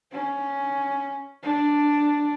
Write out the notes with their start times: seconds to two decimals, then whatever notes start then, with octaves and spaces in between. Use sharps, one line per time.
0.12 C#4
1.43 D4